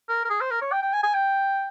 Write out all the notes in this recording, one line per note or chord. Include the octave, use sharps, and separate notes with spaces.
A#4
A#4
G#4
C5
A#4
C#5
G5
G5
G#5
G#5
G5